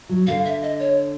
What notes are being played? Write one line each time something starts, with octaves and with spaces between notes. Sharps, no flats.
F#3
D3 F5
E5
D#5
C#5